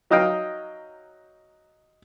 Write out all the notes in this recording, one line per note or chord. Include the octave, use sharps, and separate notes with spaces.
F#3 D#4 D#5 F5 G5